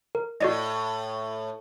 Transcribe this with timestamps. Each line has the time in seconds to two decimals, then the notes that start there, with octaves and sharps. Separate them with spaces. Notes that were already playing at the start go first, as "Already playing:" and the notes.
0.15 A#4
0.40 A2 F#4 D5 D#5